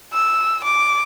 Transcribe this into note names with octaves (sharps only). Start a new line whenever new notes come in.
E6
D6